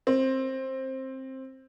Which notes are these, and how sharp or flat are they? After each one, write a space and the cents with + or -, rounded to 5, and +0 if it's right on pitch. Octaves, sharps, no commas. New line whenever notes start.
C4 +15